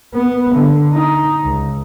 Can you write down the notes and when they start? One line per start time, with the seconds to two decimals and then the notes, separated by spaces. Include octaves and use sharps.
0.14 B3
0.55 D3
0.94 D#4
1.44 C#2